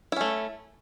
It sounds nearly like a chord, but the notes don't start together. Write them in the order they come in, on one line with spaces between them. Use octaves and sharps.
E4 C#4 A3